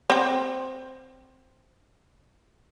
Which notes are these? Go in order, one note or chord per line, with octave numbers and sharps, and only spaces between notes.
C4 G5